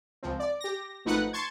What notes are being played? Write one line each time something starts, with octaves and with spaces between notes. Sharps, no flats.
C#2 F3 C4
D5
G4 A#6
G#1 F3 A3 D#4 B4 F#5
A5 C6 C#6 G#6